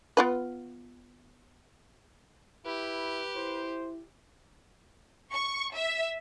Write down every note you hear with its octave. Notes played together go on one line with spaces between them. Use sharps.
B3 F4 B4
E4 G4 B4
E4 C5
C#6
E5